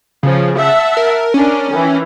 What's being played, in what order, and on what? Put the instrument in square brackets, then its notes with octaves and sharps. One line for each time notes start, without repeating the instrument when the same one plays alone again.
[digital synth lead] C#3 [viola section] F3 C#4
[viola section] E5 F#5 A5
[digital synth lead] A#4
[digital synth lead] C#4 [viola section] D4 A#4
[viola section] D#3 E3